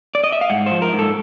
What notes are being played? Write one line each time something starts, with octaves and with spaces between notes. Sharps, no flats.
D5
D#5
E5
F5
G#2 F#5
C5
F3
A#4
G#2
A4